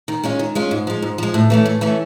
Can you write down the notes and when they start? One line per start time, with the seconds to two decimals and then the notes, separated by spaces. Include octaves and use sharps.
0.08 D#3
0.24 G#3 C#4 F4
0.39 D#3
0.55 G#3 C#4 F4
0.71 G#2
0.87 F3 G#3
1.02 G#2
1.18 F3 G#3
1.34 A2
1.50 E3 A3 C#4
1.66 A2
1.81 E3 A3 C#4